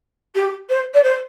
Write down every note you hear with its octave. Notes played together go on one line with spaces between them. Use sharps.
G4
C5
D5
C5